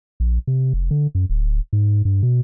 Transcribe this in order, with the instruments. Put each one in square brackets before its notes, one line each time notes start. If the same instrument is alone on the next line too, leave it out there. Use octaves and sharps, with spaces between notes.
[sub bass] A#1
C3
F1
D3
F#2
D1
G#2
G2
B2